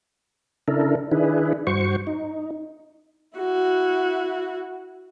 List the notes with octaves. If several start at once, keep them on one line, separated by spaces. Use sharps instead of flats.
C#3 D4 E4 A4 A#4
D#3 D4 E4 G#4 B4
G2 F#4 C5 C#6
D#4
E4 F#4